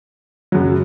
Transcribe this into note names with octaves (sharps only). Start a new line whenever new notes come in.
F#2 C#3 F#3